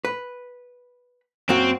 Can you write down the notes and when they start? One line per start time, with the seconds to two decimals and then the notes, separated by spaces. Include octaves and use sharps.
0.05 B4
1.49 F#2 A#3 C4 F#4